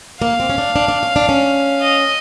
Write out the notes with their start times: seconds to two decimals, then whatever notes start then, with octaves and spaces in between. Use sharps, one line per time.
0.22 A#3 F5
0.40 C4
0.50 C#4
0.58 D4
0.76 D4
0.88 D4
1.03 C#4
1.16 D4
1.29 C#4
1.82 D#5